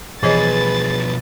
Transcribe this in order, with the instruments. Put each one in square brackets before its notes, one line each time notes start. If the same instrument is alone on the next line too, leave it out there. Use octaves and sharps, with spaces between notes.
[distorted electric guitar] B2 F3 [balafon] E3 C#5 D#5 [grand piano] G#4 [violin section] B4 A6